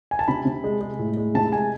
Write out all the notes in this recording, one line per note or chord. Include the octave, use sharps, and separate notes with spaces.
G#5
A5
C3 B5
C3
G#3
G#3
A2
G#3
C3 A5
G#3 G#5